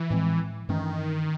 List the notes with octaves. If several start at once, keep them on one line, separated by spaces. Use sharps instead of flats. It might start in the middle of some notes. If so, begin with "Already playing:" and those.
Already playing: E3
A2 F3 G#3 C4
G2 D#3 E3 A3 C#4